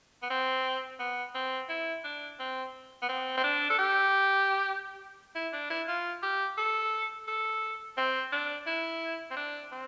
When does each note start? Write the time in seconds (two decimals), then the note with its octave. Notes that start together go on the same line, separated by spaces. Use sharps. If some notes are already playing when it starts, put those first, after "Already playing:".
0.23 B3
0.30 C4
1.00 B3
1.35 C4
1.70 E4
2.04 D4
2.39 C4
3.02 B3
3.09 C4
3.37 C4
3.44 D4
3.70 A4
3.79 G4
5.35 E4
5.53 D4
5.70 E4
5.88 F4
6.23 G4
6.58 A4
7.28 A4
7.97 C4
8.32 D4
8.67 E4
9.31 C4
9.37 D4
9.72 C4